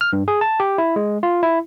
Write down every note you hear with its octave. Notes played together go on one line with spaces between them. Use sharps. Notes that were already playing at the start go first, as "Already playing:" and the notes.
F6
G2
G#4
A5
G4
E4
G#3
F4
E4